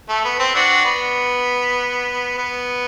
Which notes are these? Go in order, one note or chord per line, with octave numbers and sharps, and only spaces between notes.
A3
B3
C4
D4 F#4
B3
B3